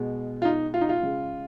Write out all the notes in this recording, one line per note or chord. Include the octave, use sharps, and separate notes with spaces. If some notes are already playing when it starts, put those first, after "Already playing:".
Already playing: B2 G#3
F4
D#4
F4
D#4
F4
C#3 G#3